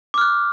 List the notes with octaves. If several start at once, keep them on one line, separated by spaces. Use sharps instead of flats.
D6 F6 F#6